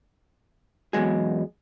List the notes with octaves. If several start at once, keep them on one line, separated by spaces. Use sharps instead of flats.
E2 G2 F#3 G#3 G#4